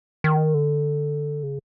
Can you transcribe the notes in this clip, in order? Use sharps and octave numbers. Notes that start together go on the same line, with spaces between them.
D#3
D3
C#3